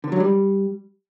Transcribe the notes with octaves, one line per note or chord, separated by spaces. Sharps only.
D3
F#3
G3